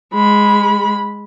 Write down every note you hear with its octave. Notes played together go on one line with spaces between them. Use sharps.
G#3 B5